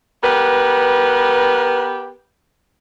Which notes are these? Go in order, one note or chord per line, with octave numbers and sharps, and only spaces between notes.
B3 G4 A#4 B4